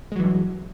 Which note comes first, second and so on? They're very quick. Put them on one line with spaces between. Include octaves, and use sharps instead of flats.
G#3 F#3 E3 G2